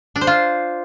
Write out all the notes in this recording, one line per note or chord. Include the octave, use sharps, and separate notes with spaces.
D4
C5
F4